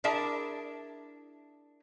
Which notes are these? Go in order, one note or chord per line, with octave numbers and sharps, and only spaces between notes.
D4 E4 G#4 A#4 E5 A5